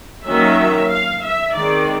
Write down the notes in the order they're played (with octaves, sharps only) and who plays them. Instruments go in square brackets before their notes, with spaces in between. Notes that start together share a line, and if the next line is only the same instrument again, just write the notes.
[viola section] D#3 F#3 A#3 C#4 E5
F5
E5
D#3 G#3 C4 D5